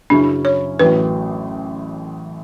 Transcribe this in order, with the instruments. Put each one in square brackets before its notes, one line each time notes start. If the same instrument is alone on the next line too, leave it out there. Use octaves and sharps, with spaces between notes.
[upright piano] F#2 C#3 F#3 C#4 E4 [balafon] D4
[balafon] C#5
[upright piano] A1 A2 F#3 [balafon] B4